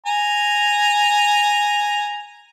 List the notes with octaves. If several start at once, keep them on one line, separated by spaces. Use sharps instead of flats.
G#5 A#5